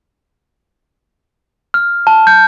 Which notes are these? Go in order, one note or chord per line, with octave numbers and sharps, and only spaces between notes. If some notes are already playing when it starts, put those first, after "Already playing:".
F6
A5
G6